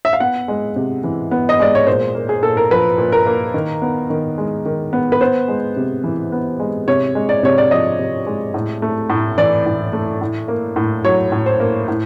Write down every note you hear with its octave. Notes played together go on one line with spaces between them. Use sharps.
E5
F5
B3 F#5
G#3
C3
E3
B3
D#5
G#3 D5
C#5
A#2 C5
A#3
G#4
A#2 A4
A#4
F3 B4
A#2
A#4
A#3
D#3
B3
D#3
G#3
D#3
B3
B4
B3 C5
G#3
C3
E3
B3
G#3
C3 C#5
G#3
D5
C3 C#5
D5
F3 D#5
C3
G#3
A2
A3
A2
E3 D5
A2
A3
A2
A#3
A2
F#3 C#5
A2
C5
A#3
A2